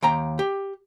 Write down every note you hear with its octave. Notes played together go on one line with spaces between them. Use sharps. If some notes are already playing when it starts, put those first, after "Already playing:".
D#2 G5 A#5
G4